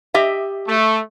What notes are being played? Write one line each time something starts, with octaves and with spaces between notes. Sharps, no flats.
G4 D#5 E5
A3